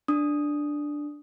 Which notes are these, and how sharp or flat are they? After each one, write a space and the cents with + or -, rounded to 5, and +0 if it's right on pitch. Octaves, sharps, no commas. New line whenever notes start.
D4 +0 D#6 +0